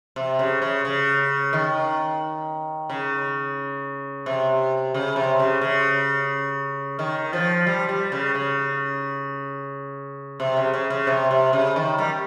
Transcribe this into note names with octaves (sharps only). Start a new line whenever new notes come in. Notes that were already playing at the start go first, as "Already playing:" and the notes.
C3
C#3
C#3
C#3
D#3
C#3
C3
C#3
C3
C#3
C#3
D#3
F3
G3
G3
C#3
C#3
C3
C#3
C#3
C#3
C3
C3
C#3
D#3
G3